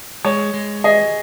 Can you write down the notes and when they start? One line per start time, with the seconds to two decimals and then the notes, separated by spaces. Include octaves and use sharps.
0.25 G#3 C#5
0.54 G#3
0.84 G#4 D#5